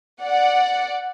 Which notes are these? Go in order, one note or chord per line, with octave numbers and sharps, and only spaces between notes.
D5 F#5